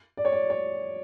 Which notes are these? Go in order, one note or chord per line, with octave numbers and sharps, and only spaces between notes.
D5
C#5
D5
C#5